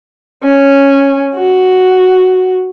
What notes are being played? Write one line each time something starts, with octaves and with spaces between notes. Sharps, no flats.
C#4
F#4